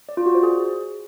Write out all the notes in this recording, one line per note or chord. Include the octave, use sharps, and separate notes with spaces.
D5
F4
F#4
C5
G#4